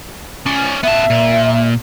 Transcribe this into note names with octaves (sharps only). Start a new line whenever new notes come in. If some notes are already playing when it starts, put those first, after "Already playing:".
C#4 D5
B3 E5 A5
A#2